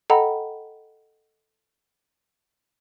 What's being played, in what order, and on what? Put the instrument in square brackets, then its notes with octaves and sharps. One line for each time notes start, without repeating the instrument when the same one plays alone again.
[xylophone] A4 D#5 F#5 G5 A#5 B5